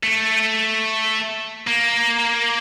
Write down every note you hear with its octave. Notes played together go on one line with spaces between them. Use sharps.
A3
A#3